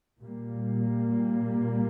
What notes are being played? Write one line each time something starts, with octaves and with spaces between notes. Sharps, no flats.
A#2 G3 A#3